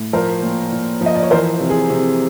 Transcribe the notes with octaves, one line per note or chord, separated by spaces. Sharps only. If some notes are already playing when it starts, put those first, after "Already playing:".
Already playing: A2
F3 A#4 C5
A#2
A#2
F3
D#5
D5
C#5
E3 A#4 C5
C3
G#4
C3